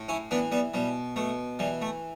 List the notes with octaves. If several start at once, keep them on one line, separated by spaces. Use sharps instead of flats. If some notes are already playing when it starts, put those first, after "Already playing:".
Already playing: A2
C#4 E4
E3 B3 D4
G3 B3
B2 G3
B2 A3
E3 G3
A3